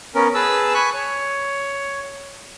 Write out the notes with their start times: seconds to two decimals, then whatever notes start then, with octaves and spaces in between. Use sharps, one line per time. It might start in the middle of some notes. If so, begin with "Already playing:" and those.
0.15 B3 C#4 A#4
0.34 G#4 B4 A5 E6
0.74 G#5 B5 C#6 F#6
0.94 C#5